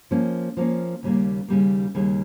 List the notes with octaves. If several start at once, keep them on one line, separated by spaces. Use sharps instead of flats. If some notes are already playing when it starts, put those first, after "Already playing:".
F3 A#3 C#4
F3 A#3 C#4
D#2 C#3 G3 A#3
D#2 C#3 G3 A#3
D#2 C#3 G3 A#3